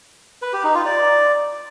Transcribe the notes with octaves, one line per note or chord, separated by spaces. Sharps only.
B4
G4
D#4
F4
D5